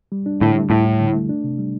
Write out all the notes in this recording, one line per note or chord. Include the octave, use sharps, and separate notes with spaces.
G3
D4
A2 D3
G3
D2 A2
E4
D3
A3
D4
C3
G3